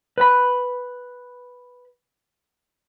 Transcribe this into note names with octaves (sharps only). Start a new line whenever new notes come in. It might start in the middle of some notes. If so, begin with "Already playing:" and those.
B4 B5